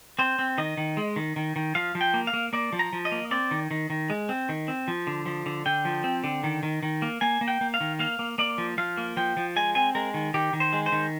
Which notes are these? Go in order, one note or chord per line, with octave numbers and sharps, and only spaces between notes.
C4 C5
C4
D#3 D#5
D#3
G#3
D#3
D#3
D#3
F3 F5
F3
G5
A#3
F5
A#3
A#3 D5
F3
A#5
F3
D#5
A#3
C4 D5
D#3
D#3
D#3
G#3
C4
D#3
C4
F3
D3
F3
D3
D3 G5
F3
C4
D3
D#3
D#3
D#3
A#3
A#3 G#5
A#3
G5
A#3
F5
D#3
A#3 F5
A#3
A#3 D5
F3
F3 F5
A#3
F3 G5
F3
G#3 G#5
C4 G#5
G#3 A#4
D#3
D#3 G4
D#3
C5
G#3
C5
D#3